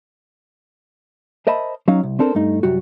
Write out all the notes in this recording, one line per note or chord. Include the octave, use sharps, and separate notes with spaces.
A#4 C5 D#5 E5 A5 B5
F#3 C#4 D#4 F5
C2
C4 D4 A4 A#4 C5
G2 A3 D#4
C2 F#2 G3 F#4